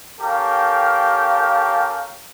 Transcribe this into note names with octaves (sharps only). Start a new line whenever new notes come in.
C#4 G4 A4 A#4 F5 G5